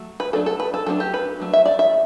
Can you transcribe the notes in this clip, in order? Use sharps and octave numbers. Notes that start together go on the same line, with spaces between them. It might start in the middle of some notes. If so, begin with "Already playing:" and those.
Already playing: F#3 A3
B4
F#3 A3 D4 A4
A4
B4
A4
F#3 A3 D4 A4
G4
B4
F#3 A3 D4
E5
D5
E5